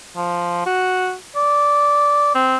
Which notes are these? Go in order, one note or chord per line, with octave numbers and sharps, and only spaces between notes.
F3
F#4
D5
C4